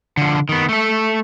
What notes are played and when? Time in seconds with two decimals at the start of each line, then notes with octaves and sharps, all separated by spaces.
0.17 D3 F3
0.49 D#3 B3
0.69 A3 A4